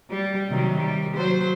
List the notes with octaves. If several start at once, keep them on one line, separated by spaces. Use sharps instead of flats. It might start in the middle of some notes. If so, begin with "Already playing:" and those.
G3
C3 D#3 F#3
G3
F#3 C5